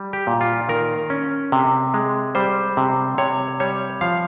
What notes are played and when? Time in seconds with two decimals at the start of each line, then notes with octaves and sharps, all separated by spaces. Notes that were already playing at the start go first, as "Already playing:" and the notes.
Already playing: G3
0.13 G4
0.27 A#2
0.41 F4
0.68 D#3 A#4
1.10 C#4
1.52 C3
1.94 G#3
2.35 G3 C5
2.77 C3
3.18 C3 C#5
3.60 G3 C#5
4.01 F3 F5